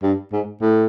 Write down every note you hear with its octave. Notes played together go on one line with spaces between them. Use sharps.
G2
G#2
A2